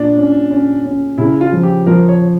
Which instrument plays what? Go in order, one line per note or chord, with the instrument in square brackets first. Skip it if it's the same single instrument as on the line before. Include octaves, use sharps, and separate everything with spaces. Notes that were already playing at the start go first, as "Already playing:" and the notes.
Already playing: [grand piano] A#2 [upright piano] D4
[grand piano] C#4
C#4
C#4
[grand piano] C#3 [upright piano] E4
[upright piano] F4
[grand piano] F3
[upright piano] G4
[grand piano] F3 [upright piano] A#4
[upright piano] C#5